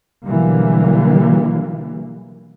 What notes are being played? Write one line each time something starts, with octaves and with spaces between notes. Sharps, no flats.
B2 D3 E3 F#3 G3 A#3